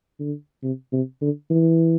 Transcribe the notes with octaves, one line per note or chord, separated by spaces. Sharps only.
D3
C3
C3
D3
E3